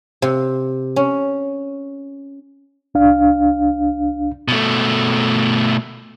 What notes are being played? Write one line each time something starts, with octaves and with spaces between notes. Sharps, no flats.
C3
C#4
C2 D4 F5
B2 A3